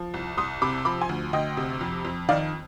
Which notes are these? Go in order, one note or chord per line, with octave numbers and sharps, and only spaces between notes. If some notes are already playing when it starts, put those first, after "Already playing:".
Already playing: F3
C2
C2 C6 D#6
C3 B5 D6
F3 B5 D6
G#5 C6
D2
D2 D#5 G5
C3
F2
F2
D#3 D5 F5